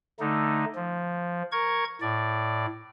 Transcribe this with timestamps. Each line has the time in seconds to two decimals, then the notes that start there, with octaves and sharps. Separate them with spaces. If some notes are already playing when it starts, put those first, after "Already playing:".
0.20 D3 A3 D#4
0.75 F3
1.52 A#4 C#6 G#6
2.01 A2 D5